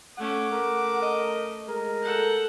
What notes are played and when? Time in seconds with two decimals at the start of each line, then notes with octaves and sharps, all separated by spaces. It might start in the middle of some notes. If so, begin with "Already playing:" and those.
0.18 A3 C#4 F#5 D6
0.51 A3 A#4
1.02 D#5
1.68 G#3 A#4
2.03 A4 F#5 G6